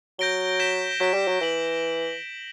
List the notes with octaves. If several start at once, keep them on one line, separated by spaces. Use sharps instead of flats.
F#3 G6 A#6 D7 G7
G6 B6 E7 G7
F#3 G6 B6 D7
G3
F#3
E3 G6 B6 F#7